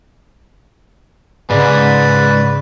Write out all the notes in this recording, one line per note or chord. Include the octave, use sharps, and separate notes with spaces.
G#2 C#3 B4 D5